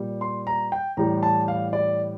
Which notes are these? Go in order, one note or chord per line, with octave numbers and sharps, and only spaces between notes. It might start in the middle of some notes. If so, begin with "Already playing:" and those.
Already playing: A#2 G3
C6
A#5
G5
A2 E3 G3 A#5
A5
F5
D5